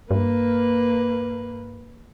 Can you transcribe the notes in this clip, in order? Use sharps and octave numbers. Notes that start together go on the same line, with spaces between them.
G2 A#3 B4